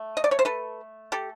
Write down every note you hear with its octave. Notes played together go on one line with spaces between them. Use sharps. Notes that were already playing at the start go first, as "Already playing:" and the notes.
Already playing: A3
D#5
D5
C#5
C5
A4 B4
G4 A4